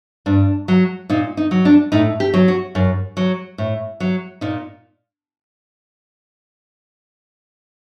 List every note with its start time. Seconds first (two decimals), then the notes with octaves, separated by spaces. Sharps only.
0.26 G2 D4
0.68 F#3
1.10 A#2 D#4
1.37 D#4
1.51 F#3
1.65 D4
1.92 A2 D#4
2.20 G4
2.34 F#3
2.48 F#4
2.75 F#2
3.17 F#3
3.58 A2
4.00 F#3
4.41 A#2 D#4